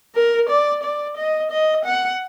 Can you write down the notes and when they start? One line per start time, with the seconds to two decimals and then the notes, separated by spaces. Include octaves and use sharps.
0.15 A#4
0.49 D5
0.83 D5
1.17 D#5
1.51 D#5
1.85 F#5